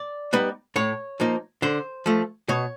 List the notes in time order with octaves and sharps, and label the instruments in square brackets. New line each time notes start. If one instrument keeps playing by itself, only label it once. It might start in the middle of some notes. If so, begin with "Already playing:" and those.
Already playing: [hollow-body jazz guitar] D5
G3 B3 D#4
A2 C#5
F3 A#3 D#4
D3 C5
F3 A3
B2 C#5